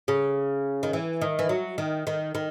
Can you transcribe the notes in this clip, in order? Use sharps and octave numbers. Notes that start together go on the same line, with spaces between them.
C#3
D#3
E3
D#3
E3
F#3
D#3
D#3
D#3